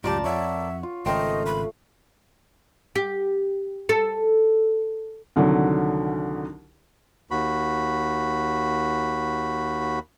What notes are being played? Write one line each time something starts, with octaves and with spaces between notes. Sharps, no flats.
C#2 F#2 A2 F4 G4 A#4 D5 A5
F2 C#5 E5 F#5
F4
G#1 C#3 A3 A#4 C5 D#5 G5
B5
G4
A4
C2 D3 D#3 F#3
D#2 F#4 B5